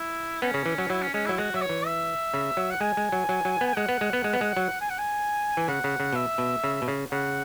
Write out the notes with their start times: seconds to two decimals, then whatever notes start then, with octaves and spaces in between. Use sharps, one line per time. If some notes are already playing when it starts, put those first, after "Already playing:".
Already playing: E4
0.42 B3 C#4
0.54 C#3
0.66 E3
0.78 F#3
0.90 F#3 E4
1.02 C#4
1.14 G#3 C#4
1.26 F#3 E4
1.38 G#3 F#4
1.54 F#3 E5
1.61 C#5
1.69 E3
1.86 E5
2.34 C#3
2.57 F#3
2.71 F#5
2.81 G#3 G#5
2.97 G#3
3.12 F#3
3.29 F#3
3.45 F#3
3.61 B3
3.67 G#5
3.76 G#3 F#5
3.89 B3
4.01 G#3
4.13 B3
4.24 G#3
4.33 B3
4.41 G#3
4.57 F#3
4.81 G#5
4.90 F#5
4.99 G#5
5.57 E3
5.68 C#3 F#5
5.84 C#3
6.00 C#3
6.13 B2 E5
6.38 B2
6.64 C#3
6.82 B2
6.88 C#3
7.11 C#3 F#5